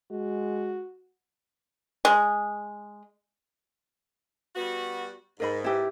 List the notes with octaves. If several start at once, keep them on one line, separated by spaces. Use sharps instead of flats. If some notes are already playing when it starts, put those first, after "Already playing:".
G#3 F#4
G#3
G3 B3 F#4
G#2 A#4 D#5 B5
E4 G4 B4